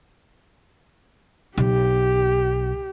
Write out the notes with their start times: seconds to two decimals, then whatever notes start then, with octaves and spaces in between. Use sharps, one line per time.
1.57 B1 G4